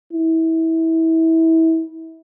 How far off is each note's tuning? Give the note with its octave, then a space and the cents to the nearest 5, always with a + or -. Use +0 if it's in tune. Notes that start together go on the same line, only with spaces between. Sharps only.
E4 -25